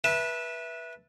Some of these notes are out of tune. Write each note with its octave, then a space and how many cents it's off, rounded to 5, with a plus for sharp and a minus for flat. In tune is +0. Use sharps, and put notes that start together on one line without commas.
B4 -20 E5 +0 A5 +0